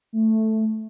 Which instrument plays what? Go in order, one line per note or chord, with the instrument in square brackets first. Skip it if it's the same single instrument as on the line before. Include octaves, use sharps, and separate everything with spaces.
[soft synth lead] A3